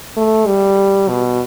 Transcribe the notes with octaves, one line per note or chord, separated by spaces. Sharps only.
A3
G3
B2